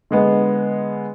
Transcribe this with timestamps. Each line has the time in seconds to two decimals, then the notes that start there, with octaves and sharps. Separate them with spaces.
0.11 D3 G#3 B3